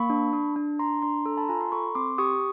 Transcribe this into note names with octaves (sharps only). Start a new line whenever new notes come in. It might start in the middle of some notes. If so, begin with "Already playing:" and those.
Already playing: A#3 B5 C#6
D4
D4
D4
D4 A#5 C6
D4 A#5 C6
A4 A#5 C6
A5 B5
F4 G#5 A#5
A#5 C6
A4 B5 C#6
C4 C6 D6
G4 C#6 D#6